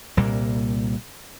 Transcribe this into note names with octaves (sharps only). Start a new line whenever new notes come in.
C2 A#2 G3 A#3